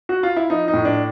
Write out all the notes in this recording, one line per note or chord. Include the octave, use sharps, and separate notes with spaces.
F#4
F4
E4
F3 D#4
D#4
A2
D4